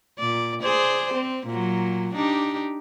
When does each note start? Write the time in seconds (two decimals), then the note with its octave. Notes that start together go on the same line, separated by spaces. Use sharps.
0.19 A#2 D5
0.62 G#4 C5 D5
1.14 C4
1.47 A#2 F#3
2.14 D4 D#4 G4